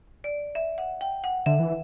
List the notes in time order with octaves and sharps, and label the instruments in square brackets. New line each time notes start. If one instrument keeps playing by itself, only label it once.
[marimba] D5
E5
F#5
G5
F#5
[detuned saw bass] D3 [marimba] E5
[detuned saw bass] E3